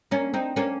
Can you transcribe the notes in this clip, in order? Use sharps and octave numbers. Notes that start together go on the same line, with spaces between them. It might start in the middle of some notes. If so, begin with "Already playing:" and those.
A#3 C#4
C4 D#4
A#3 C#4